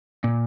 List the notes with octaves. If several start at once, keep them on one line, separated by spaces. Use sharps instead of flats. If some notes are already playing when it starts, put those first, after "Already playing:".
A#2